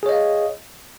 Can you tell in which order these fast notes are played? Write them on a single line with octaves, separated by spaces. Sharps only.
G#4 C#5 D#5 F5